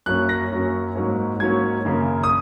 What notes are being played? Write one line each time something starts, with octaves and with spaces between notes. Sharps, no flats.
F#2 F#3 A#3 C#4 F#6
A#6
F#2 F#3 A#3 C#4
G#2 F#3 A#3 C#4
G#2 F#3 A#3 C#4 G#6
F#2 C#3 A#3
D#6